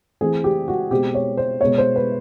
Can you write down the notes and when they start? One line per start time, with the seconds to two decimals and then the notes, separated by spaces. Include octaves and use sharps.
0.21 E3 A3 C4 G#4
0.44 G4
0.68 F#4
0.91 B2 G#3 C4 G4
1.15 C#5
1.37 C5
1.61 B2 G#3 B3 C#5
1.78 C5
1.96 B4